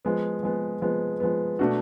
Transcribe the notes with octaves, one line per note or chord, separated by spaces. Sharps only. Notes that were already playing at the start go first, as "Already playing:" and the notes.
F3 G#3 B3
F3 G#3 B3
F3 G#3 B3
F3 G#3 B3
B2 A3 D4 F#4